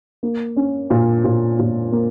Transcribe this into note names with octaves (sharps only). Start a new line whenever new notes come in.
A#3
C#4
A#2
A#2
A#2
A#3